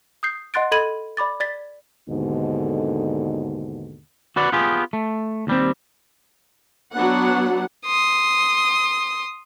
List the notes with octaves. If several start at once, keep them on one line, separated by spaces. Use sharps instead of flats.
D#6 G6 C7
D#5 F#5 C6 F#6 A6 D7
A4 D#5 B5 G#6 D#7 F#7
D5 B5 D6 A6
D5 A6 B6
D#2 G#2 B2 D3
F#4 B4 D5 F#5
B3 F4 G4 G#4
A3
D#2 G3 C4
F#3 B3 D4 F#4 F#5
C6 D#6